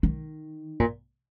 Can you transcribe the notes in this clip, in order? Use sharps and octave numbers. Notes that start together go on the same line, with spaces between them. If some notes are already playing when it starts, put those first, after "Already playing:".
D#3
A#2